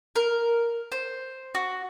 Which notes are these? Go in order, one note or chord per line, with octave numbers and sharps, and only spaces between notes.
A#4
C5
F#4